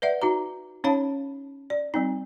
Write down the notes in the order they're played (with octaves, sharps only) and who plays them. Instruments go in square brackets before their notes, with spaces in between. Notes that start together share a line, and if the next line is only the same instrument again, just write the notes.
[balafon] B4 D5 E5 F#5
D#4 F#4 A#5
C#4 D#4 C#5 F5 A5 B5
D5
G3 C4 D#4